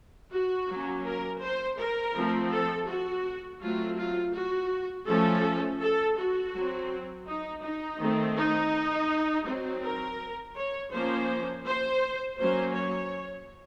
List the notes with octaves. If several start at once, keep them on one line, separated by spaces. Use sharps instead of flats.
F#4
F#3 A#3 C#4
A#4
C5
A#4
F3 A3 C4
A4
F#4
F#3 A3 C4 F4
F4
F#4
F3 A3 C#4 A4
A4
F#4
F#3
C4
D#4
D#4
D#3 A3 C4
D#4
F#3 C4
A#4
C#5
F3 A#3 C#4 C5
C5
F#3 A#3 C#4 C5
C#5